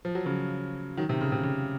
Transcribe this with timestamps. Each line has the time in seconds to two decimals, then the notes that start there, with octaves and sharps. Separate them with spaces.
0.05 F3
0.15 F#3
0.25 C#3 F3
0.97 D#3 F#3
1.09 C3 D#3
1.21 C#3
1.32 C3
1.43 C#3